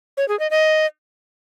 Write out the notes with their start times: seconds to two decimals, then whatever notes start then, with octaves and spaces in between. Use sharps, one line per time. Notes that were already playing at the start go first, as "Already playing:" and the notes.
0.17 C#5
0.28 G#4
0.39 D#5
0.51 D#5